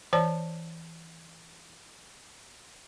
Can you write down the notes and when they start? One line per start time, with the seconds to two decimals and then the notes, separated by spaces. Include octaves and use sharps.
0.13 E3 C5 D5 A5